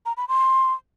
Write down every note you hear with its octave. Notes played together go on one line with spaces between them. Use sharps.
A#5
B5
C6